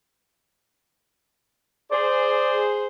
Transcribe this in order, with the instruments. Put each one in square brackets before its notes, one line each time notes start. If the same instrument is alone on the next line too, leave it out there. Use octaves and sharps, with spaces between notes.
[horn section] G#4 C5 [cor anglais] D5